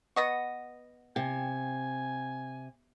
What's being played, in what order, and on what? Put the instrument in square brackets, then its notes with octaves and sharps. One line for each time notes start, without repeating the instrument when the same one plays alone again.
[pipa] B3 D#5 C#6 [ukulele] F#5
[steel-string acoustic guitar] C3 [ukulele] G5 [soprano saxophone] G#5